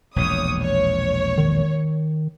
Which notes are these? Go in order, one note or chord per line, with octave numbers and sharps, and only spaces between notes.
E1 A#1 E2 C#5 D#6
C#5
D#3